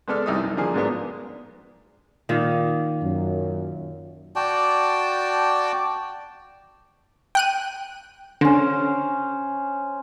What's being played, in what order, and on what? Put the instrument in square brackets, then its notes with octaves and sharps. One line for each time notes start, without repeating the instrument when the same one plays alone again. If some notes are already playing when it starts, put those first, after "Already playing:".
[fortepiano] G#3 B3 A4 D5 F6
C2 G3 D#4 E5 D#6
F#2
D3 F3 A#3 G#4
G#2 F#3 G#3 A#3 B3 D4
[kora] A#2 D#3 A#3
[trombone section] F#2
[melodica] F#4 D5 G5 A5
[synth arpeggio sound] G5 F#6 D#7
[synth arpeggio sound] D3 [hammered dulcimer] C#4 C5